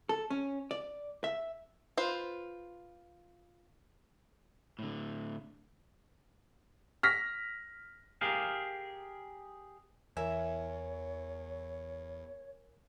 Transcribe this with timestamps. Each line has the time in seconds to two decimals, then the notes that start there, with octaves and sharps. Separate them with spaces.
0.09 A4
0.30 C#4
0.71 D5
1.24 E5
1.97 F4 B4 C5
4.79 A2 D3
7.03 F6 A#6 B6
8.21 G4 G#4 A#4 F5
10.17 E2 E3 A#4 C#5 E5 G#5